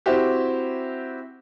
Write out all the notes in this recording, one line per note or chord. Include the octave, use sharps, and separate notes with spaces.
C4 E4 F#4 G4